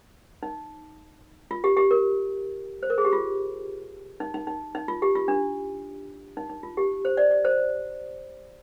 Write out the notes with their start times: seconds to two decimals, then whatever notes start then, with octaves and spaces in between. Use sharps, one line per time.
0.43 D#4
1.51 F4
1.64 G4
1.77 G4
1.91 A#4
2.83 C5
2.90 A#4
2.98 G#4
3.05 G4
3.13 F4
4.20 D#4
4.34 D#4
4.47 D#4
4.75 D#4
4.88 F4
5.02 G4
5.15 F4
5.28 D4
6.37 D#4
6.50 D#4
6.63 F4
6.77 G4
7.05 C5
7.17 D5
7.31 D5
7.45 C5